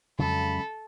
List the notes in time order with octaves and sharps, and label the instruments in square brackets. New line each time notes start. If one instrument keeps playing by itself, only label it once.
[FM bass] F2 [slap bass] C#3 F#3 G#3 [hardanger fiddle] A4 [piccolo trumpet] B5